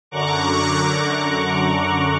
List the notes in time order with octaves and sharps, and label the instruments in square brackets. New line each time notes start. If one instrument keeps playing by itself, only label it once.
[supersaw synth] F#2 D3 A#5 C#6 D6 F#6